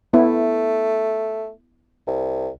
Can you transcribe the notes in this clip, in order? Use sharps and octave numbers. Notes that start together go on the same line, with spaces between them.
A3 B3 E4
C2